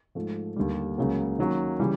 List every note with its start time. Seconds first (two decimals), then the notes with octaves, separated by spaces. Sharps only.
0.15 G#2 F3 A3
0.56 D#2 D3 G3
0.98 C#2 C#3 F#3 A#3
1.38 D#3 F#3 A#3 C#4
1.80 C#3 E3 G3